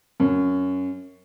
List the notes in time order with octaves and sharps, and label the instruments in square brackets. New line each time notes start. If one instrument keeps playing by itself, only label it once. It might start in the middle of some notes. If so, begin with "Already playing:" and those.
[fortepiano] F#2